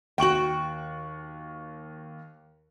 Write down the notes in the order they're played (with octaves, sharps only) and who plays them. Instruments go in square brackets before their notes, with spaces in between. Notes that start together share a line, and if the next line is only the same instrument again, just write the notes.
[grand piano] D#2 C#6 F#7 [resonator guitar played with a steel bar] F#4 G5